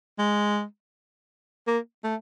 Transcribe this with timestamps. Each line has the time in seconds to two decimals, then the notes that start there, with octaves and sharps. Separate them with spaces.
0.19 G#3
1.67 A#3
2.04 A3